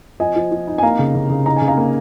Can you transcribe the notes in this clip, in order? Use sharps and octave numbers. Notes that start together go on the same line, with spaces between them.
F3 D#5 G#5
F3
F3
D#4
G#5
A#3 F5 A#5
C#3
C#3
C#3
D#4 A#5
G#5
C#3
F5 A#5
A#3